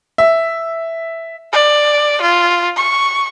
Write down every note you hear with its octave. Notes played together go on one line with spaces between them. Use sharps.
E5
D5
F4
C#6